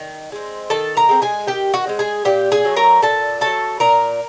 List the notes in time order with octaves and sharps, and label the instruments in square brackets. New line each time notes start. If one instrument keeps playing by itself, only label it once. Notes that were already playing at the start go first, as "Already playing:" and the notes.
Already playing: [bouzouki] D#3
G#3 C4
D#3 A4 A5
A#4 A#5
G#3 C4
G#4 G#5
D#3 G4 G5
F#4 F#5
G#3 C4
G#4 G#5
A#2 G4 G5
G#4 G#5
F#3 A3
A#4 A#5
A#2 A4 A5
F#3 A3 A4 A5
A#2 A#4 A#5